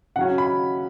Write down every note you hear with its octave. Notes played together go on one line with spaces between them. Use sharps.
C#3 F#3 C#4 F#5
B5